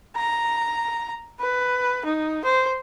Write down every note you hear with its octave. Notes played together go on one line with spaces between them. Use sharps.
A#5
B4
D#4
C5